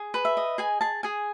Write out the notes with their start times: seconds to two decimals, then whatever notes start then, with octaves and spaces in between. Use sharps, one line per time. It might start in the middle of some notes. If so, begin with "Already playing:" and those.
Already playing: G#4
0.14 B4
0.25 E5
0.37 D#5
0.58 G#4 G#5
0.81 G#4 A5
1.03 G#4 G#5